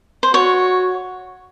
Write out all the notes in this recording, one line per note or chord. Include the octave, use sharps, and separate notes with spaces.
C5
F#4 C#5